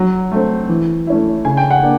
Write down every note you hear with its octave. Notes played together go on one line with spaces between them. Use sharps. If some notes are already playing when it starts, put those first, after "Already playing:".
Already playing: F#3
A3 C4
E3
A3 C#4 E4
C#3 G#5
G5
F#5
A#3 D4